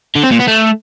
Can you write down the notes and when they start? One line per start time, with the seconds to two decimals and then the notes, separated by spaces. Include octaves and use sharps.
0.15 D3
0.23 C4
0.31 A#2
0.39 B3
0.47 A3